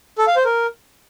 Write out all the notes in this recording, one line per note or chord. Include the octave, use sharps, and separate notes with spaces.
A4
F5
C5
A#4